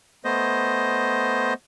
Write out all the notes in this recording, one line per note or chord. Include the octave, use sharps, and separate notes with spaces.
A3 B3 C5 D#5